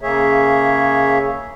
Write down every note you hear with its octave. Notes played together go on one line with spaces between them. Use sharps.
C#3 A#3 G#4 C#5 E5